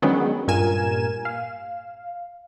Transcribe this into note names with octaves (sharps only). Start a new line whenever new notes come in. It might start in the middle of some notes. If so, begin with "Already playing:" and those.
D3 D#3 F#3 G#3 B3 C#4
G2 A#2 A#4 G#5 E7
F5